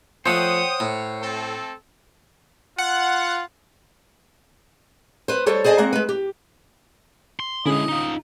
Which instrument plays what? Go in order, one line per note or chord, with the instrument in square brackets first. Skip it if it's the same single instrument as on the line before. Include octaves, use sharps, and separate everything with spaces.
[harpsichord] F3 A3 [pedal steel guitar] C5 C#5 F#5 [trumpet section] G5 D#6
[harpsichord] A2
[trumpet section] A3 C4 A4
[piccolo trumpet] F4 [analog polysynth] F#5
[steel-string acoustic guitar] B4 C5
G3 A4 C5 C#5
G#4 C5 D5 D#5 G#5 A5
G#3 A#3 C4 F#5
G#3 B4
G4
[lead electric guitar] C6
[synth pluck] D3 C#4 G#4 [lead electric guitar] G#3 E4 [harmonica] D#5
[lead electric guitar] D#4 F4